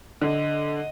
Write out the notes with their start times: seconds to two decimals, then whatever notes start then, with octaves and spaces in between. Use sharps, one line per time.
0.22 D3 D#5